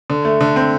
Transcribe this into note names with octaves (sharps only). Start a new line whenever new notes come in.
D3
A3
D3
C4